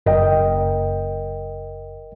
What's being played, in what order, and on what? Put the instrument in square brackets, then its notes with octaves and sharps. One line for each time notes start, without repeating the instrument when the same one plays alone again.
[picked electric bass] F#1 [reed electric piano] A#4 D#5 G5